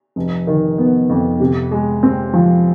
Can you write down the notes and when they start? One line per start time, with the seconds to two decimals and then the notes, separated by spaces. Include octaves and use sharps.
0.16 F1
0.47 D#3
0.78 B3
1.09 F2
1.40 C3
1.71 G#3
2.03 C4
2.33 F3